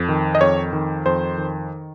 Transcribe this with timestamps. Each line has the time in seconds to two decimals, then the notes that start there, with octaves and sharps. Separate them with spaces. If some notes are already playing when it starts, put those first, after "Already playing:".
Already playing: F2
0.09 D#3
0.35 D#5
0.41 F2 C#5
0.73 D#3
1.06 F2 C5
1.38 D#3